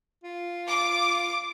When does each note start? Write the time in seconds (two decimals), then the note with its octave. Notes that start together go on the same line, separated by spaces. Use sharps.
0.24 F4
0.69 D6